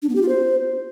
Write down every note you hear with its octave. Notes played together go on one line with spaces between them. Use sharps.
D4
B3
G4
F4
C5